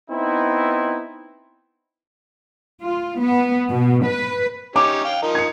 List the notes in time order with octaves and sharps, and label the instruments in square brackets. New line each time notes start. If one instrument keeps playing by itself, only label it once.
[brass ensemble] B3 C4 D#4 E4
[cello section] F4
B3
B2
B4
[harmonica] C#4 D#4 G4 [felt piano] D6
[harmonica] F5 G5
F3 D#4 A#4
[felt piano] G#6 C#7